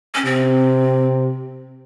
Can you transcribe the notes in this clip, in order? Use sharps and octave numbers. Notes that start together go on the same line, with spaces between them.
C#4
C3 C4